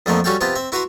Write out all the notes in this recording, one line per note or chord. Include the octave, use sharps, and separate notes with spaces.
F2 D3 F3 A3 A#3 D#4
G3 C#4 F#4 A4 F5 G5
C3 B3 F4 G5 A5
C4 E5
E4 F#4 B4 F#5 A#5 C6